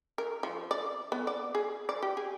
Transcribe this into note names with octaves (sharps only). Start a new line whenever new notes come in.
A#4
F3
D5
B3
D5
G#4
D5
G4
G#4